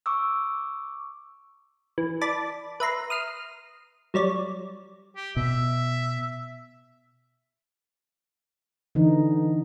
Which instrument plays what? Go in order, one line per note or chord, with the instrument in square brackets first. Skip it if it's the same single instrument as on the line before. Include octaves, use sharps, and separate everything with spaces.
[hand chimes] C#6 D6 E6
[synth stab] E3
D5 A5 B5 D6
B4 E5 A#5 C6
D#6 F6 C7
F#3 G3 C#5 D5
[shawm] G4
[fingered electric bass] B2 [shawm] E5
[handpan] D3 E3 D#4